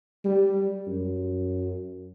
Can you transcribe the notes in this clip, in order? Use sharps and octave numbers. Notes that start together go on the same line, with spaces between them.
G3
F#2